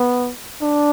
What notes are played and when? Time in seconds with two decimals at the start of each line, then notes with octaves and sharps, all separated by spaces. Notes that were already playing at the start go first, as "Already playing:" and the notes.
Already playing: B3
0.62 D4